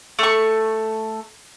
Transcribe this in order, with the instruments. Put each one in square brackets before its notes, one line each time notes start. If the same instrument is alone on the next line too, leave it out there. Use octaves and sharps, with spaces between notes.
[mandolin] A3 C#6